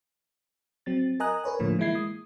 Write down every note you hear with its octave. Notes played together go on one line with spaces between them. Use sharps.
F#3 C4 A6
A#4 D#5 G#5 A#5 D#6 F#6
A#4 B4 C#5 G#5
A2 D3 F3 A3 A#3
E3 G#3 A#3 E4 G#6 C7
D#6